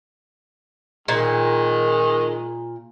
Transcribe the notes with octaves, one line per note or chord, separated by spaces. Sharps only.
A#2 D#3 G#3